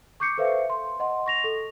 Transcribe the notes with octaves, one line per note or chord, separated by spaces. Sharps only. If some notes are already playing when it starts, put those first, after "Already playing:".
C#6 D6 G6 C7 C#7
A4 B4 C5 E5 F5
C6
D#5 F#5 C6
C#6 A#6 F7
A4